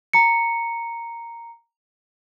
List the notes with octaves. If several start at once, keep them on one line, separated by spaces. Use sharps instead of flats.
A#5 C#7